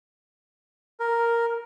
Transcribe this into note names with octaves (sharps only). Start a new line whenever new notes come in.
A#4